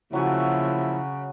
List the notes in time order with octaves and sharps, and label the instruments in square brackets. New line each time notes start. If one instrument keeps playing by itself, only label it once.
[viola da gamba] C#3 [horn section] F3 A#3 E4 [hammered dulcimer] F#3 F#4 G#5